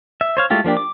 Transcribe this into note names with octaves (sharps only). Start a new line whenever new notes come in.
E5
C5 C#5 F5
G#3 A3 E4 F4 G4
F3 A#3 D4 G4
D6